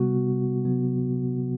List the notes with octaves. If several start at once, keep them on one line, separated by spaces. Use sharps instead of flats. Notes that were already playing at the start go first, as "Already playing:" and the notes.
Already playing: C3 G3 B3 F#4
C3 F#3 B3